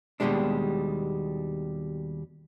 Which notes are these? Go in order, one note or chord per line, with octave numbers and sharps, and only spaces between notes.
D#2 B2 E3 G3 G#3 D4